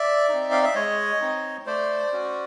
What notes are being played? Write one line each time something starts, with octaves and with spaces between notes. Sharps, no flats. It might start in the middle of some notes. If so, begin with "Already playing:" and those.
Already playing: D5 E5
C4 D#4
F5
E5
G#3 C#5 D#5
C4 D#4
A3 C5 D5
C#4 F#4